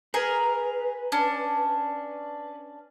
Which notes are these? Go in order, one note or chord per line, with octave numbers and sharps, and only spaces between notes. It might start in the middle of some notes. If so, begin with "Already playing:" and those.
G#4 A#4 B4
C#4 D4